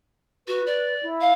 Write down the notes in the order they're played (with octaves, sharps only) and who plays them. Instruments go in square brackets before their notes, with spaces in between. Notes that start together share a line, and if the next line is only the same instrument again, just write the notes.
[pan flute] F#4 [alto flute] B4
[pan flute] D5
[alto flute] E4
[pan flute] F5